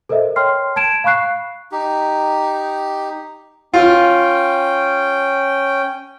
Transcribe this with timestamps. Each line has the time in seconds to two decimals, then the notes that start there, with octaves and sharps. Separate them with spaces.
0.09 A4 A#4 C5 D#5 E5
0.36 C#5 G5 C6 F6 C7
0.76 A5 G#6 D7 E7
1.04 F5 B5 C#6 F#6 C7
1.72 D#4 G4
3.74 C#4 F4 G5